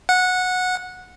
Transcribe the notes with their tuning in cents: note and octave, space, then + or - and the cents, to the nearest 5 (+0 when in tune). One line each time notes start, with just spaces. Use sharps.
F#5 -15